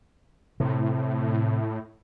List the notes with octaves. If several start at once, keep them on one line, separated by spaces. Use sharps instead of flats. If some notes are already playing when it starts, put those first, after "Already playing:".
A2 C3